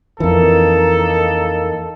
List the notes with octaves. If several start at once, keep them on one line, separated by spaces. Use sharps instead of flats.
F2 E3 A#3 D#4 A4